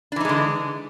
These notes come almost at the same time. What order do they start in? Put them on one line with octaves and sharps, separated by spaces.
D4 E3 D#4 G#3 D3